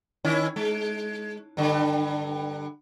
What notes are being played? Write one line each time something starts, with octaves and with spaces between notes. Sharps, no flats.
D#3 C#4 E4
G#3
G2 D3